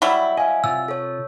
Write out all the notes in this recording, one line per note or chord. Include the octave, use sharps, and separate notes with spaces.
F#3 G3 E4
D#5 F5 G#5
C3 F4 E6
A4 C#5